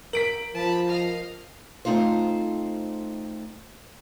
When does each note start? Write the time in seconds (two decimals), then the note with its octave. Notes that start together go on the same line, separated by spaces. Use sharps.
0.13 A#4 B6 D7 F#7
0.54 F3 A5 B5
0.89 D#5 F5
1.85 A3 C4 D#4 F4 C5